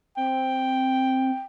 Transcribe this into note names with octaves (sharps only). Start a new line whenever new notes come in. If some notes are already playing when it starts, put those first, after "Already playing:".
C4 G5